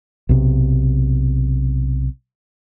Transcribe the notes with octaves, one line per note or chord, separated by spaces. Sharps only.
B1 C3